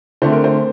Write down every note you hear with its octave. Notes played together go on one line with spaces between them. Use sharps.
D3 A3 C4 C5
A#4
C5